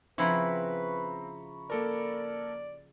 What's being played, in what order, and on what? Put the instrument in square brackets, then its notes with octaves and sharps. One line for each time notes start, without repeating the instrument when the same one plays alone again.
[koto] C#3 F3 E4 [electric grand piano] C4 [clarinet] B4 [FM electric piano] A#5 B5 C#6
[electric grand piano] A#3 A4 A#4 [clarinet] D5